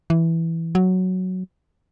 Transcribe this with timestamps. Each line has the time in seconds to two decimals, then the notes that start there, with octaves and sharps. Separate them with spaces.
0.10 E3
0.75 F#3